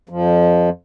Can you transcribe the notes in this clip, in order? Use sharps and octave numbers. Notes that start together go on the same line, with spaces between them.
F2 F3